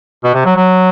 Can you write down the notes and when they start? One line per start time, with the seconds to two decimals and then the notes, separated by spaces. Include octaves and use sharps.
0.24 B2
0.34 C3
0.45 F#3
0.57 F#3